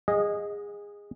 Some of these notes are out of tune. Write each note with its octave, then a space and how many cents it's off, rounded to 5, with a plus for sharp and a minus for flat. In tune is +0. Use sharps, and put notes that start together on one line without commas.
G#4 -20 D#5 +0 F#5 -45